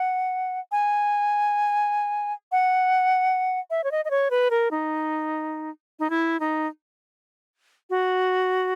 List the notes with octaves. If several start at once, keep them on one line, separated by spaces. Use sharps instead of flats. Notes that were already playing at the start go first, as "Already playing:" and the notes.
Already playing: F#5
G#5
F#5
E5
C#5
D#5
D#5
C#5
B4
A#4
D#4
D#4
E4
D#4
F#4